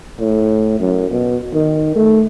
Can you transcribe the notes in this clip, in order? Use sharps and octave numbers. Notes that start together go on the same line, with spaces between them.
A2
F#2
B2
D#3
A3